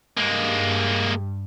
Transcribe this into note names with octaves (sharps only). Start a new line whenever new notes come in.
G2 G#3 A#3